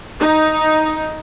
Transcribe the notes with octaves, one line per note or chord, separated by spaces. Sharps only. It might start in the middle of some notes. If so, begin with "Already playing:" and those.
D#4